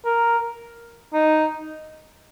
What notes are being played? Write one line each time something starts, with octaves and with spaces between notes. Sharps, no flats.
A#4
D#4